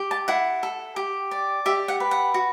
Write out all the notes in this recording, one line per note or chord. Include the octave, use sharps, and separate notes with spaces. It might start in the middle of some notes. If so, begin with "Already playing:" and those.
Already playing: G4
A5
E4 F#5
A4
G4
D5
G4 E5
F#5
B4
F#5
F#4